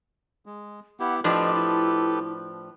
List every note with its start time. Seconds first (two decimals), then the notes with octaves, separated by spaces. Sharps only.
0.46 G#3
1.00 B3 E4 G4 F#5
1.24 A2 F3 D4 G4 A4 B4 D#5
1.54 E4